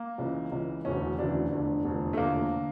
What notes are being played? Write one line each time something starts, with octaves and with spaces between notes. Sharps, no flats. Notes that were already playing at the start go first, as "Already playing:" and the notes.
Already playing: A#3
C#2 C#3 E3
C#2 C#3 E3
E1 D2 C#3 E3 C#4
E1 D2 C#3 E3 D4
F1 E2 D3
F1 E2 D3
A3
F1 E2 D3 A#3
D3